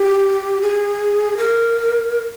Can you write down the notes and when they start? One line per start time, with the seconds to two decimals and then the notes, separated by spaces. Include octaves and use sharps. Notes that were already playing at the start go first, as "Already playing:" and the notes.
Already playing: G4
0.61 G#4
1.38 A#4